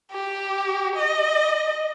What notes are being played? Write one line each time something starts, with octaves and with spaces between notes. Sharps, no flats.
G4
D#5